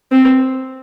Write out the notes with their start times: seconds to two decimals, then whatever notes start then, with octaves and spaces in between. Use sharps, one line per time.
0.12 C4